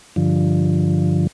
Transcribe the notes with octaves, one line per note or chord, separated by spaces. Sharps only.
G2 D3 F3